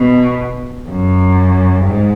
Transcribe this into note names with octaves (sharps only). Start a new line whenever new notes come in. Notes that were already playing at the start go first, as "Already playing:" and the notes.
Already playing: B2
F#2
G#2